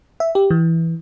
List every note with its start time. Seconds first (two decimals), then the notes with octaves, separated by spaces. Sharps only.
0.20 E5
0.35 G4
0.51 E3